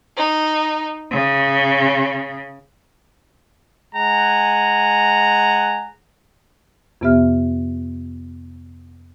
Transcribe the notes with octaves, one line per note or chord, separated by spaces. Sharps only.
D#4
C#3
G#3 F#5 G#5 A#5
F2 C3 B3 G4 E5 F6